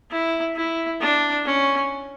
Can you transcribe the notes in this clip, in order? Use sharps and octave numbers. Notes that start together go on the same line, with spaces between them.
E4
E4
D4
C#4